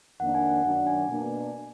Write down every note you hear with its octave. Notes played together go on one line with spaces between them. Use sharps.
F2 D#3 A#3 D4 F#5
G#5
F#5
F#2 D#3 F#3 D4 F#5
G#5
B2 A#3 D4